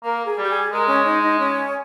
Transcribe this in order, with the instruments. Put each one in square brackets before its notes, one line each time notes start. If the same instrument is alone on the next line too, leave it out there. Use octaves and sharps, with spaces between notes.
[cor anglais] A#3 [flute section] A#4
[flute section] G#4
[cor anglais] G3 [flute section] G4
[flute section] G#4
[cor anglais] G#3 [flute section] A#4
[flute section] C#4 C#5
D#4 D#5
D#4 D#5
C#4 C#5